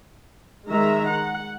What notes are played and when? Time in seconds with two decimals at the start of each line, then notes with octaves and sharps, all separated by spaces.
0.68 D#3 G#3 E5 A#5
1.06 F#5